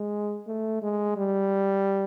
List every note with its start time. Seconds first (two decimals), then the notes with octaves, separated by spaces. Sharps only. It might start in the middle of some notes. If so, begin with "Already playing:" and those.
Already playing: G#3
0.48 A3
0.82 G#3
1.17 G3